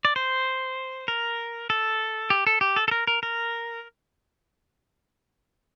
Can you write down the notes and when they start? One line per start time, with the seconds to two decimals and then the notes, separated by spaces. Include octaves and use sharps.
0.05 D5
0.16 C5
1.08 A#4
1.70 A4
2.30 G4
2.47 A4
2.61 G4
2.76 A4
2.88 A4
2.91 A#4
3.07 A#4
3.23 A#4